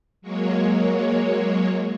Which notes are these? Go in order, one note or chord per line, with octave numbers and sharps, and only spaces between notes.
F#3 G#3 A#3 C#5